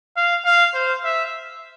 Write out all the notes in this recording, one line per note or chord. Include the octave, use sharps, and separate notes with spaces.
F5
F5
C5
E5